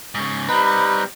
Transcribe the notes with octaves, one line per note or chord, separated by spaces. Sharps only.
G#2 C#3
G3 C4 D#4 B4 B5